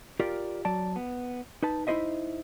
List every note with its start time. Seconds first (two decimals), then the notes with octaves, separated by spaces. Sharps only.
0.20 F4 G4 A#4 D5
0.65 F#3 D5 A5
0.96 B3
1.63 D#4 B4 A5
1.87 D#4 E4 G#4 C5 D#5 E5